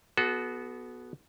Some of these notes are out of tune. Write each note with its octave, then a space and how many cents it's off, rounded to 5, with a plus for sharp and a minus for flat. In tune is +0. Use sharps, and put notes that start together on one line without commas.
B3 +0 F#4 +0 A4 -35